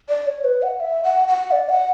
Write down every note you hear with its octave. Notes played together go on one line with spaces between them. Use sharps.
D5
C#5
B4
F#5
E5
F#5
F#5
D5
F#5